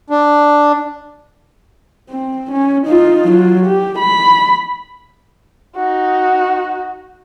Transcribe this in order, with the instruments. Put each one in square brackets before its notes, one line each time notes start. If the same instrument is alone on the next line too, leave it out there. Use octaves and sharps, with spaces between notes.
[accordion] D4
[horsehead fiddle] C4
C#4
D#4 F4
F#3 F4
G4
B5
[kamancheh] D#4 F#4